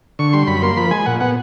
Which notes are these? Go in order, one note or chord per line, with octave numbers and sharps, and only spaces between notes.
D3 C#6
G3 C6
F#2 B5
A#3 C6
F3 B5
G#3 G#5
A#2 F#5
B3 F#5